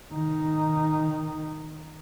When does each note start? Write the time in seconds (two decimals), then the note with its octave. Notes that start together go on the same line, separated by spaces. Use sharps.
0.13 D#3 D#4